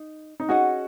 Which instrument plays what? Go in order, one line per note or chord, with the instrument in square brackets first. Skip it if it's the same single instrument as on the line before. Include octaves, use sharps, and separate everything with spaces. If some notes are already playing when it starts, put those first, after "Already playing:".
Already playing: [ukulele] D#4
[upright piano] D#4
[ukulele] C#4 G#4 D#5 F#5 [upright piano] F#4